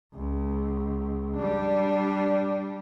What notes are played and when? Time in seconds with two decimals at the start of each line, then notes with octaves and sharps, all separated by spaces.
0.14 C#2
1.36 G3 D4